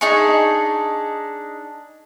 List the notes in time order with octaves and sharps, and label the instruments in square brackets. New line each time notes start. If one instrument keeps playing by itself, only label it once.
[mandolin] D4 D#4 G#4 C#6